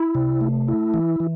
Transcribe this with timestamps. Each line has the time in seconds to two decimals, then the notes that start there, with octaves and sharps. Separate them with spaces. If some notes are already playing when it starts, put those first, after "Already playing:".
Already playing: E4
0.15 C3
0.41 A3
0.68 E4
0.94 E3
1.20 E3